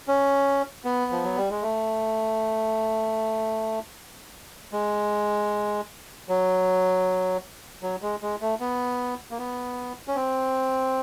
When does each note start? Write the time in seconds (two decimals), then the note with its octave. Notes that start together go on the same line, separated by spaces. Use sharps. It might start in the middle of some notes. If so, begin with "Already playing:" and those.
0.08 C#4
0.85 B3
1.12 F3
1.23 F#3
1.36 G3
1.50 G#3
1.62 A3
4.72 G#3
6.29 F#3
7.83 F#3
8.02 G#3
8.22 G#3
8.41 A3
8.60 B3
9.31 A#3
9.39 B3
10.08 C#4
10.15 C4